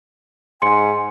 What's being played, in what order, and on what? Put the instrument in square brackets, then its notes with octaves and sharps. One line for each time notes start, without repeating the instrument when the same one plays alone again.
[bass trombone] G#2 [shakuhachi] G#5 [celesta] C6 C#7